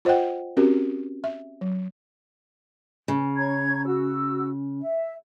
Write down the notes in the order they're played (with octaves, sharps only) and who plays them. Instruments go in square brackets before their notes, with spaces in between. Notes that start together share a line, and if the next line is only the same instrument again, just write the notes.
[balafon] F4 C5 D#5 F#5 G5
C4 C#4 F#4 G4 A#4
E5
F#3
[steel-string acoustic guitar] C#3
[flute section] C#5 A#5 G#6
F#4 E6
E5